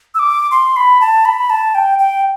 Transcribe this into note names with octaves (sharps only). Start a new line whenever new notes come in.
E6
D6
C6
B5
A5
B5
A5
G5
G5